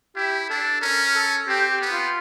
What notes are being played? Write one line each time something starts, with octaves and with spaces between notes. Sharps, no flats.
E4 G4
D4 A4
C#4 A#4
A4
C4 G4
G4
B3
F4